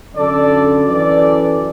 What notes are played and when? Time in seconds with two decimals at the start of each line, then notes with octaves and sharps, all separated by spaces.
0.15 F#2 D3 A4 D5
0.87 F#2 E3 A4 D5